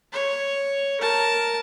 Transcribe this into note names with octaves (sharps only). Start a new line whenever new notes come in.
C#5
A#4 A5